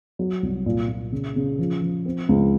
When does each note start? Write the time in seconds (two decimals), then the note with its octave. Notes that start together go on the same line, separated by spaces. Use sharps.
0.19 F#3
0.43 C2
0.66 A#2
0.88 A#2
1.12 C#3
1.36 C#3
1.59 F3
1.82 F3
2.05 C4
2.29 C#2